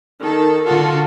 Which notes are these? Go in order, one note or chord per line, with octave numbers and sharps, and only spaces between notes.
D#3 A4
D3 F4 F#4 A4